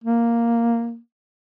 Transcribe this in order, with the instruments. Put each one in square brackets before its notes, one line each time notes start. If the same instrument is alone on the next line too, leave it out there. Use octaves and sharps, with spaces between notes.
[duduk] A#3